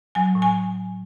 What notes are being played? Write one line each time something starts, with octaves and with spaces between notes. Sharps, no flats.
F#3 G#5
A2
G#5